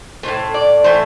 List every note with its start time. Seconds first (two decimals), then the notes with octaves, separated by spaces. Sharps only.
0.23 A2 E3 A3 C5
0.54 D5
0.84 A2 E3 A3 C5